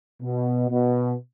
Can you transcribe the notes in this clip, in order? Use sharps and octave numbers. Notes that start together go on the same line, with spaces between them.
B2
B2